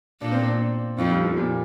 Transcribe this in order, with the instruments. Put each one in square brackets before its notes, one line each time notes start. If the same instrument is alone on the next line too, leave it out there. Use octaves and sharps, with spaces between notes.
[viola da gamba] A#2 A#3 [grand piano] D4
[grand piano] C4
D4
[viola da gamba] F2 F3 [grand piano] D#4
[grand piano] G3
F3
A#2